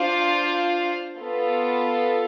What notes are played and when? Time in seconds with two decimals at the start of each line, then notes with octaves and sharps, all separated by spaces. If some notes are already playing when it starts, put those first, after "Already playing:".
Already playing: D4 F4 C5 F5
1.20 B3 F4 A4